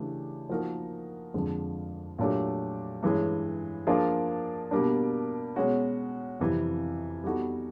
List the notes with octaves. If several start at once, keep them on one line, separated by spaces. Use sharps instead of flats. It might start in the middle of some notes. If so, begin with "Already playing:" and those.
Already playing: C#3 E3 A3 D4 G4
F3 A#3 D#4 F#4 A#4
F2 D3 F3 G#3
A#2 F#3 A3 D4 G4
G2 E3 G#3 C#4
F3 A#3 D4 F4 G#4
B2 G3 A#3 D4
B2 G#3 C#4 F#4
F2 C3 E3 G3
G3 B3 D#4 F#4 A4